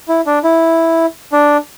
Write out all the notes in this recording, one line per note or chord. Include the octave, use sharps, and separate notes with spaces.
E4
D4
E4
D4